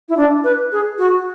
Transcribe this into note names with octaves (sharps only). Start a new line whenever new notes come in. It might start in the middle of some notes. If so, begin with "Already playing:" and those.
E4
D4
B4
G#4
F#4